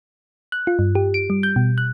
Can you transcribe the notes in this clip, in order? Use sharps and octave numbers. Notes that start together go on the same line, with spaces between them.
F#6
F4
G2
G4
D7
G3
G6
B2
F#6